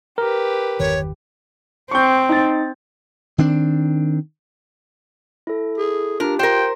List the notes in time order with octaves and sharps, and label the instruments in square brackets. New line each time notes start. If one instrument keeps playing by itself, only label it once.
[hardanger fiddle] G4 B4 [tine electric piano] A#4
[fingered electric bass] G1 E2 D#3 [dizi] C#5
[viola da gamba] C4 [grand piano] C#6 G6
[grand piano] D#4 A6
[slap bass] D#3 C4 D4
[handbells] E4 A4
[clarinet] G#4
[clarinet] D4 [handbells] F4 G4 [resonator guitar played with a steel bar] A#4
[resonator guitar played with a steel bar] A#4 C5 [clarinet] G5